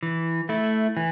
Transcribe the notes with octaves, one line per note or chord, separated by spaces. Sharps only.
E3
A3 E4
E3